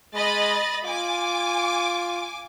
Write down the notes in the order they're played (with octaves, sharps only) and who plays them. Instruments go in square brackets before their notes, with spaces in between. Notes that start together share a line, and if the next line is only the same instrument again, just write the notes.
[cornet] G#3 [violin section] D#5 B5 A6
[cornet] F4 [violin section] G#5 D6